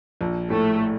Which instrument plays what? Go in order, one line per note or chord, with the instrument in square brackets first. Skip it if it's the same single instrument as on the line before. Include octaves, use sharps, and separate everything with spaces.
[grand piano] A#1
[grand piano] A2 [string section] A3